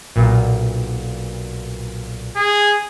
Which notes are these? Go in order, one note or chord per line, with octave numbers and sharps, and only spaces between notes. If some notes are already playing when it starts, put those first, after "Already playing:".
B1 A#2
G#4